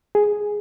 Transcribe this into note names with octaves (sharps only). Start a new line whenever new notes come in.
G#4